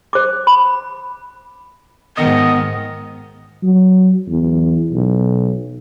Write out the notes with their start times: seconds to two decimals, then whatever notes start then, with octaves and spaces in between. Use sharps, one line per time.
0.13 C5 D6
0.47 B5
2.17 G#2 D#3 B3 D#5
3.63 F#3
4.28 E2
4.92 B1